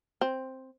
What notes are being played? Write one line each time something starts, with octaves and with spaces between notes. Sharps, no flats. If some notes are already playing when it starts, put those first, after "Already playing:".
C4